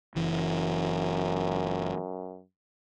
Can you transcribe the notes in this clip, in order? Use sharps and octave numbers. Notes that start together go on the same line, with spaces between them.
F#1 F#2 E3